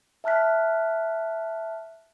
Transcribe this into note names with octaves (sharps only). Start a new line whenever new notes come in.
E5 A5 F6 F#6 B6